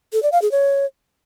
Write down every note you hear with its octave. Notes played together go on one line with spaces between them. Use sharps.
A4
D5
F5
G#4
C#5